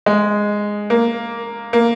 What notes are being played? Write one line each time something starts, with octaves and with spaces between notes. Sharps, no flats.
G#3
A#3
A#3